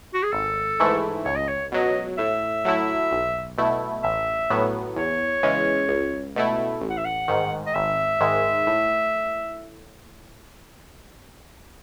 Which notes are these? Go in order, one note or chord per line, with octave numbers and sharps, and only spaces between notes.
F#4
G#4
G#1 A4
G#2 E3 A3 E4
C#2 C#5
D#5
C#5
B2 F#3 D#5
A2 E5
F#3 A3 E4
B1
B2 A3 E4
A1 E5
A2 F#3 B3
E2 C#5
C#3 E3 G#3 C#4
C#2
B2 A3 E4
A1
F#5
E5
F#5
G#2 D#3
D#5
G#1 E5
G#2 D#3 G#3
A2